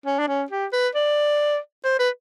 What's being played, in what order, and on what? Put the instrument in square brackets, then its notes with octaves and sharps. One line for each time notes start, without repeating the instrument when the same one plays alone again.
[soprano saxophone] C#4
D4
C#4
G4
B4
D5
C5
B4